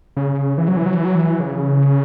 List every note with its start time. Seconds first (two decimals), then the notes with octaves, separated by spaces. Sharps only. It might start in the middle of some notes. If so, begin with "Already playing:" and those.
0.17 C#3
0.58 E3
0.68 F#3
0.77 E3
0.86 F#3
0.96 E3
1.05 F#3
1.15 E3
1.40 C#3